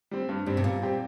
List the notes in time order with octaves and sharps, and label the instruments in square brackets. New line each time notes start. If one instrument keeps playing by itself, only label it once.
[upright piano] G3 C4
G2
[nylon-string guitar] G2 [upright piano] G3 C4
[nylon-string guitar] C3
[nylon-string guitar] A#2 [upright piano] G3
[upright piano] C4 G4